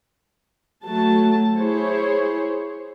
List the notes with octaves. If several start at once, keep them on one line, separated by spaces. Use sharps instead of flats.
F#3 A3 A5
E4 G#4 C5 C#5